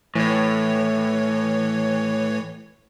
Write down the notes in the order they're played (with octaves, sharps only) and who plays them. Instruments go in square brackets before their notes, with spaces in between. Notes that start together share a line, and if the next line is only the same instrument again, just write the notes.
[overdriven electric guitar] A2 [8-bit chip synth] E3 C#5